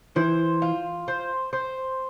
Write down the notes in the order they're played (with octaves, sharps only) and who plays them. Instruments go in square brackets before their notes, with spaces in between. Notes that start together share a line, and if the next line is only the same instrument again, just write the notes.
[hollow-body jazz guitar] E3 [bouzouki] C5
[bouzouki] F4
C5
C5